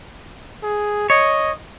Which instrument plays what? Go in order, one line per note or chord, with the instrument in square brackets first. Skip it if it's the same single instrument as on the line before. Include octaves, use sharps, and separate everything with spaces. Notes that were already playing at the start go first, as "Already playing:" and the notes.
[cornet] G#4
[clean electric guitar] C#5 [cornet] D#5